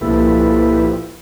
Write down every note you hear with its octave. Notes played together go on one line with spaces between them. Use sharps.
C2 A#2 F3 A#3 E4 G4 A4 B4